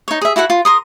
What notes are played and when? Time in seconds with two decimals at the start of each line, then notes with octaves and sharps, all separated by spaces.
0.08 D#4 C#5
0.21 G#4 E5
0.36 E4 F#4 A4 F#5
0.50 F4
0.65 A#4 C6 D#6